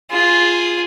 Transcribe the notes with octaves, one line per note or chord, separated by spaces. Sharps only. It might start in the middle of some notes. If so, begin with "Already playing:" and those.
F4 G#4